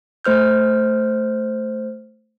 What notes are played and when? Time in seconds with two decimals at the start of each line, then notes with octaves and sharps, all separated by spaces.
0.24 A3 C5 F6 G6